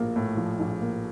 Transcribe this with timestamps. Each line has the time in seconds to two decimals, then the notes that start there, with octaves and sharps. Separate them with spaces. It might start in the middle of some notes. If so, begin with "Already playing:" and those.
Already playing: A#1 A2 F3 A#3
0.16 A2
0.37 F3
0.60 A#1
0.81 A#3